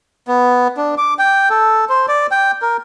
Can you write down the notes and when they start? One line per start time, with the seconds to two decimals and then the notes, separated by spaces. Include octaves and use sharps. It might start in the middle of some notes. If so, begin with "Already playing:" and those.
0.28 B3
0.77 D4
0.98 D6
1.19 G5
1.50 A4
1.89 C5
2.08 D5
2.31 G5
2.62 A#4